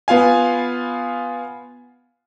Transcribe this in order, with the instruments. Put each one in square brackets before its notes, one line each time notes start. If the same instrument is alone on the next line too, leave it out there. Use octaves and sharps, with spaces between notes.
[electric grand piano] B3 F4 F5 G#5